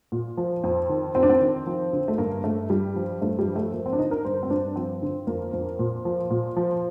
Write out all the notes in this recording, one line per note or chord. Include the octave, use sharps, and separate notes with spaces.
A#2
F3
F2
D#3
F2 C4
D4
C4
D#3
F3
D3
A3
G2 A#3
G2 A3
G2 G3
F3
G2 A3
G3
F3
A3
F3 A#3
C4
D4
D3 D#4
A#4
G2 C5
C4
G2 D4
F3 C4
D3
F2 A#3
F2
A#2
F3
A#2
F3